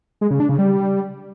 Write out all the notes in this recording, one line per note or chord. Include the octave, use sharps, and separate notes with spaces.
G#3
C#3
D4
C#3
G3